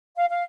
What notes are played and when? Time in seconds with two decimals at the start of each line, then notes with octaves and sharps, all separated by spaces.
0.17 F5
0.29 F5